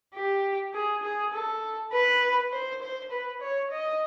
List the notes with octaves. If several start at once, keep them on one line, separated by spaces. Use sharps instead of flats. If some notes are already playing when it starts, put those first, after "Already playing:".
G4
G#4
G#4
A4
B4
C5
C5
B4
C#5
D#5